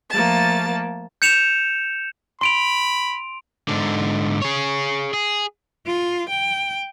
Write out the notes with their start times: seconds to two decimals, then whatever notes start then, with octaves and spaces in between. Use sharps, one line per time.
0.10 F3 A3 A#3 A5 A6
1.22 G6 C#7 E7 F7
2.41 B5 C6 D7 F7
3.68 G#2 D3
4.42 G#4 C#5
5.13 G#4
5.87 F4
6.29 G5